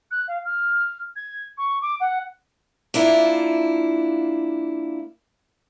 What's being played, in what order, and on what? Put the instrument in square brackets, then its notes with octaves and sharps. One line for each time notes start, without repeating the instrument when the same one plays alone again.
[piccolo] F#6
F5
F6
G#6
C#6
D6
F#5
[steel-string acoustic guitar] A#3 D4 E4 F4